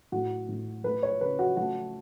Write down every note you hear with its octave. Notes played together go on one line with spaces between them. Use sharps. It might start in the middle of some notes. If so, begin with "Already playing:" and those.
A2 F#4
A2
A3 B4
C#5
C#3 B4
F#4
A3 F#4